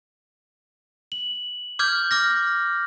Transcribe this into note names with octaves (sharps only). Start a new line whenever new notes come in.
F#7
D6 F6 G6 G#6
D6 F6 A#6